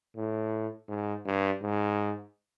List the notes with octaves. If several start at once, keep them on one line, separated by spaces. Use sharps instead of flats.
A2
G#2
G2
G#2